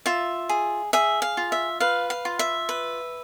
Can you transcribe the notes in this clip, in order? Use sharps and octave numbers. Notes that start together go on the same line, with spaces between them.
F4 E5
G#4
G#4 E5
F5
F4
E5
B4 F5
F5
F4
E5
B4